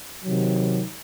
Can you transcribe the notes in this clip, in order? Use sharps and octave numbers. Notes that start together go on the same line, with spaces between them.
C3 D#3 F#3